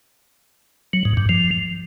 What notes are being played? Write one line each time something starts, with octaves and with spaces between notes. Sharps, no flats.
F#3
G#2
G2
F3